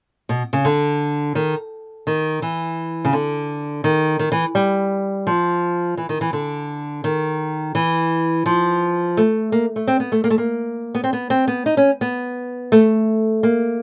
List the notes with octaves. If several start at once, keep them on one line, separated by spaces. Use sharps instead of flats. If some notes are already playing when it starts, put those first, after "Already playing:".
B2
C#3
D3
D#3
D#3
E3
C#3
D3
D#3
D#3
E3
G3
F3
E3
D#3
E3
D3
D#3
E3
F3
A3
A#3
A3
C4
B3
A3
A#3
A3
A#3
B3
C4
B3
C4
B3
D#4
C#4
B3
A3
A#3